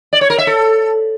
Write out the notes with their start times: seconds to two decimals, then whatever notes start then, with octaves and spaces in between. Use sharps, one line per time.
0.13 D5
0.21 C#5
0.30 A#4
0.38 E5
0.47 A4